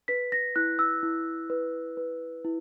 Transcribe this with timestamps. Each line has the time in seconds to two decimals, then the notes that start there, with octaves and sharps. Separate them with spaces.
0.08 B4 B6
0.32 A#6
0.56 E4 F#6
0.79 E6
1.03 E4
1.50 B4
1.97 B4
2.45 E4